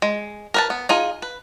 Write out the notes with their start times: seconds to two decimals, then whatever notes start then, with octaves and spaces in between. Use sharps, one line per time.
0.02 G#3
0.54 A#4 B4 A5
0.70 B3
0.89 D#4 F4 G#4
1.22 B4